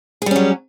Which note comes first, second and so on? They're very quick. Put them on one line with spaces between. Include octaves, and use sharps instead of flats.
G#4 G3 C#4 F#3